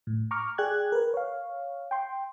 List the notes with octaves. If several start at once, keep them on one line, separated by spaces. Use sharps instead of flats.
A2
A#5 C#6 D6 F6
G#4 D5 G5 F#6 G#6
A#4 B4
C#5 F5
G5 C6